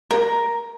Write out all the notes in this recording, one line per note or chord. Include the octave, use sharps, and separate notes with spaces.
A#4